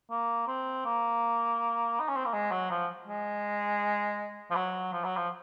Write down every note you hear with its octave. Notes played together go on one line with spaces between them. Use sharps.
A#3
C4
A#3
D#4
C#4
C4
A#3
G#3
F#3
F3
G#3
F3
F#3
F3
F#3
F3